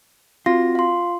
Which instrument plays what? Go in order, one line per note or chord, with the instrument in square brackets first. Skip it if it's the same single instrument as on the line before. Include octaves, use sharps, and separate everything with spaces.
[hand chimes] C4 F#4 A#6 [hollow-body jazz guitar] F4
[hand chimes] F5 C6